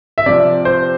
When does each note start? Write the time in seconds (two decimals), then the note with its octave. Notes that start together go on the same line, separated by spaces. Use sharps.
0.18 E5
0.26 C3 F3 D5
0.65 C5